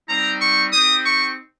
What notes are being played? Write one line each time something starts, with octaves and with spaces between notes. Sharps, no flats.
G3 C4 D#4 A#5
C#6
C4 D#4 G4 D#6
C#6